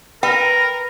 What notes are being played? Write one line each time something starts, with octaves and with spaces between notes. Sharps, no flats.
A#4 B4 G5